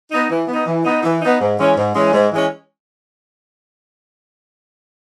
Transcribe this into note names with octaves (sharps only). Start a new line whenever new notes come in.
B3 D#4
E3
B3 D#4
E3
B3 D#4
E3
B3 D#4
G#2
E3 G#3 C#4
G#2
E3 G#3 C#4
G#2
E3 G#3 C#4